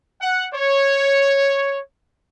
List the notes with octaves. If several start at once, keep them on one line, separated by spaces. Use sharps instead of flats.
F#5
C#5